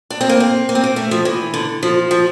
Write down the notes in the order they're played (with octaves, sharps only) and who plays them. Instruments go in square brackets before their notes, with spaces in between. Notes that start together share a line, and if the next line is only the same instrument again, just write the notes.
[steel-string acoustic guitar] D4
C4
A#3
C4
A#3
C4
A#3
A3
F3
E3
D3
F3
F3